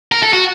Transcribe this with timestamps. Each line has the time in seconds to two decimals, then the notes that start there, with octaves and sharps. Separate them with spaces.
0.12 A#4
0.23 A4
0.33 F#4